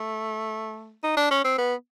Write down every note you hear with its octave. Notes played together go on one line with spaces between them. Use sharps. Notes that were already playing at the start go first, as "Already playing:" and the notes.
Already playing: A3
D#4
D4
C#4
C4
B3